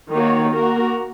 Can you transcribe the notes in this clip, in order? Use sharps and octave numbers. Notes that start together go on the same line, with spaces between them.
D#3 A#3 F#4 C#5
A#3 F#4 A#4